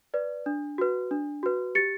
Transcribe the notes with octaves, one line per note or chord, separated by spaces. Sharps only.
B4 D5
D4
F#4 B4
D4
F#4 B4
G4 A6 C#7